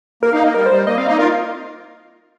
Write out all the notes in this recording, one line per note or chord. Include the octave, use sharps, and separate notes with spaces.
A#3 A#4
A#3 D#4 F5
A#3 D#5
G3 A#4
G3 C5
A#3 D#5
G3 C4 F5
A#3 D#4 D#5
F4 A#4 F5